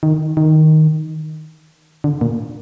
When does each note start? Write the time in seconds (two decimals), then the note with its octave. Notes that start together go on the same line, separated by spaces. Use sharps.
0.03 D#3
0.37 D#3
2.04 D3
2.21 A#2